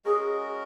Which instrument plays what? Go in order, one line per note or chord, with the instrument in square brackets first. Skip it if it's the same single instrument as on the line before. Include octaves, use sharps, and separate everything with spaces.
[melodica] G#3 C#4 F#4 A#4 [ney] G#4